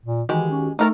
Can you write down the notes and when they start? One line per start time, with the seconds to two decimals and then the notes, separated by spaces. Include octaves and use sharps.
0.05 A#2
0.29 D#3 E3 G#3 F#4 G4
0.51 C#4
0.79 D#3 A3 D#4 A4 A#4 A#5